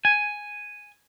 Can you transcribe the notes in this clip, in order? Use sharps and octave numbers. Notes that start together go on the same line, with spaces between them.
G#5